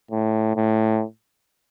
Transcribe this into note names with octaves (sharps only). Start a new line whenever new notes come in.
A2
A2